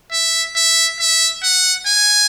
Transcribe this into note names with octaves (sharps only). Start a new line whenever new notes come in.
E5
E5
E5
F#5
G#5